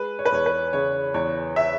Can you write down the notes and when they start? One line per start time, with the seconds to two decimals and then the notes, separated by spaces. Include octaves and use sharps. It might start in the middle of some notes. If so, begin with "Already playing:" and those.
Already playing: G#3 B4
0.19 C#5
0.25 B4
0.32 E2 C#5
0.46 B4
0.73 C#3 C#5
1.14 E2 C#5
1.56 E5